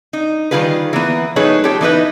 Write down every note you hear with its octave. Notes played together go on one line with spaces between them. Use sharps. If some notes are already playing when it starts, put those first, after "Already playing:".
D#4
D#3 F3 G3 F4 G#4 B4
E3 A#3 B3
F#3 A3 D#4 G#4 B4 C#5
F4 G4 A4 C#5 G5
E3 B3 D#4 F#4 B4 D#5